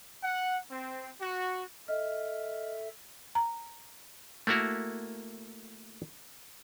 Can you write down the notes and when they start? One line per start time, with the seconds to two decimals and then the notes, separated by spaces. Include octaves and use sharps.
0.23 F#5
0.70 C4
1.21 F#4
1.88 A4 D#5 E5 F6
3.35 A#5
4.47 A3 A#3 E4 F#4 A#4